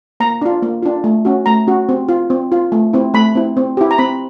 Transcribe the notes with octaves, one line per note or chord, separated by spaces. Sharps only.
A#3 A#5
D4 F4
A#3
D4 F4
A3
C#4 F#4
A3 A#5
C#4 F#4
C4
F4
C4
F4
A3
C4 E4
A3 B5
C4 E4
C4
E4 G4
A#5
C4 B5